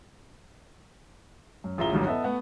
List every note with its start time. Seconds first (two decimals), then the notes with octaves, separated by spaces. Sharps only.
1.64 F#2
1.78 A1 F4 G#4 E5 A#5 G7
1.92 A1 G2 D#3 F#3
2.07 B3 A4 D#5 E5
2.24 A3 B3 F#5